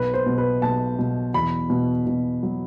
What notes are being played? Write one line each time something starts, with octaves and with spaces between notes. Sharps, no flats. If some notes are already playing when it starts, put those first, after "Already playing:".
Already playing: B1 B4
C5
B2
B4
B1 A5
B2
E2 B5
B2
B2
F#3